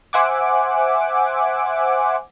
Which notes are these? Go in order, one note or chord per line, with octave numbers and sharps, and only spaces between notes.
C5 E5 F#5 G#5 D6